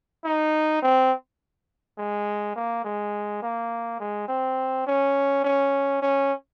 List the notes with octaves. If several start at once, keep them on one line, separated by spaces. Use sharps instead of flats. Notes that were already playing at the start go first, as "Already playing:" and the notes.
D#4
C4
G#3
A#3
G#3
A#3
G#3
C4
C#4
C#4
C#4